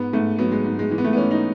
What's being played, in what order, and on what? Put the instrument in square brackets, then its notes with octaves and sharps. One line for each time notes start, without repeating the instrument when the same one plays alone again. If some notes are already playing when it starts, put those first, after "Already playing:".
Already playing: [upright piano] G#2 B3
G#2 A3
F#3 B3
G#3
G#2
G#3
E3 G#3
B3
A3
B3
E3 C#4
D#4